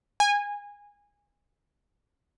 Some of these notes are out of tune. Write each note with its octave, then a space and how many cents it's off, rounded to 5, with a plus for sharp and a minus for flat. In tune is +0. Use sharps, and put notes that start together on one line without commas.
G#5 -20